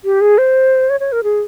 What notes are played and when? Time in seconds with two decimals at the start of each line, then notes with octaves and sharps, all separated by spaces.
0.05 G4
0.21 G#4
0.38 C5
0.90 C#5
1.00 C#5
1.12 A#4
1.23 G#4